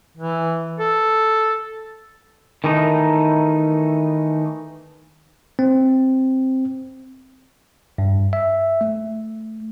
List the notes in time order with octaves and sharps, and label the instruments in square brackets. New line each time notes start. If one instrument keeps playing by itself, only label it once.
[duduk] E3
A4
[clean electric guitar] D#3 E3 A3 D#4
[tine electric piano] C4
G2
E5
A3